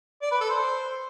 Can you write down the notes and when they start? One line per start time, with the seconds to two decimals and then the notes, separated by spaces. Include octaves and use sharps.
0.22 D5
0.31 B4
0.41 A4
0.50 C5